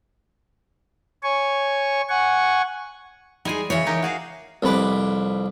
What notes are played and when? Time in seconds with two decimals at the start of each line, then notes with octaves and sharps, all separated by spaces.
1.23 C#5 G#5 C#6
2.09 F#5 G#5 C#6
3.45 G3 G#3 D#4 G#4 G#5
3.70 C#3 E3 C#5
3.87 D#4 G4 A#4
4.02 F#4 G#4 F5
4.63 C2 F2 B4 D6